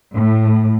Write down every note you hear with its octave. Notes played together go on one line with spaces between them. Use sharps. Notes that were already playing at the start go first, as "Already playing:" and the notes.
A2